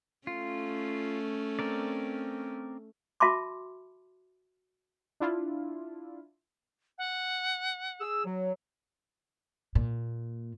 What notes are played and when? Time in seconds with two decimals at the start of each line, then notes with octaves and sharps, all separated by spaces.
0.27 A3 C#4 F4
1.59 C4 A#4 D5
3.20 F#4 E5 A5 B5 C6 D6
5.20 D4 E4 F4
6.98 F#5
8.01 G#4 E6
8.25 F#3
9.75 A#2